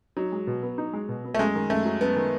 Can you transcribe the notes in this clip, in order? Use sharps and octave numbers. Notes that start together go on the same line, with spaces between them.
F#3 D#4
G#3
B2
B3
D#4
G#3
B2
B3
A3
F#2 G#3
D#3
F#2 A3
F#3
F#2 B3
D#3